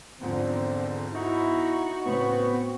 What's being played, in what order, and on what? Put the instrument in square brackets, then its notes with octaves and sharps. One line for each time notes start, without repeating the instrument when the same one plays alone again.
[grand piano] E2 G#2 F3 [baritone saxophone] D3 [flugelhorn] C4
[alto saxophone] D#4 [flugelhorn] E4 [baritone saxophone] F#4
[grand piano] A2 C#3 [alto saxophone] B3 [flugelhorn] C4